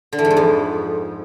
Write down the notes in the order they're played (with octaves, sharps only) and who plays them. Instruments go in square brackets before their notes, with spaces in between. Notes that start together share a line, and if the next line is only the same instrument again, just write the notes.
[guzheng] D3
E3
G#2
E2
F2